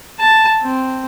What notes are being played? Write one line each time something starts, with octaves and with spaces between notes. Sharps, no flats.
A5
C4